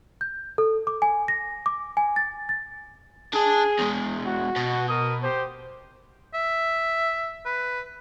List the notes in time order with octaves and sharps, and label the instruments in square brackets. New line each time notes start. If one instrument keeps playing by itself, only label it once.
[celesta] G6
A4
D6
G#5
A#6
D6
G#5
A6
A6
[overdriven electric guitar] D4 A5 [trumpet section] G#4
[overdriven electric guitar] E2 G#3
[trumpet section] F#4
[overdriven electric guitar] B2
[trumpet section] A#4 D#6
G4 C5
[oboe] E5
B4